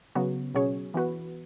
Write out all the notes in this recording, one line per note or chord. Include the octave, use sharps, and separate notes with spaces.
C#3 F#3 B3 F#4
B2 F#3 C#4 G#4 C#5
E3 B3 F#4 B4